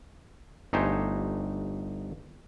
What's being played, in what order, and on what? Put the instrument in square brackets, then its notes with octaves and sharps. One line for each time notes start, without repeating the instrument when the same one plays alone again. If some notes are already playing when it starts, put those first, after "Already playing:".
[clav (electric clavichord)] G1 A3 D#4 G4 C5 G#5